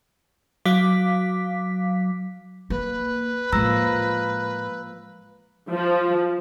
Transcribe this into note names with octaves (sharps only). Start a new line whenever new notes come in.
F#3 F5 D6 B6
A#3 B4
A2 F3 G#3 A#3 A#5 E6 A#6
F3